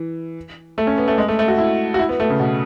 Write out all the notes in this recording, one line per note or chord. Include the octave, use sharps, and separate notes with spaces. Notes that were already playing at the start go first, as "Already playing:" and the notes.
Already playing: E3
A3
C#4
B3
A3
G#3
A3
A3
F#4
E4
F#4
E4
B3
A3
C#3
B2